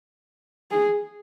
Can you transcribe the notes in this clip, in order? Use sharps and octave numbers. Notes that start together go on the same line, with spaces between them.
G#4